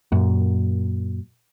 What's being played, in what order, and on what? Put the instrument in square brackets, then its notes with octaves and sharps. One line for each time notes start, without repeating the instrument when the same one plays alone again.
[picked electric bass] F#2 A#2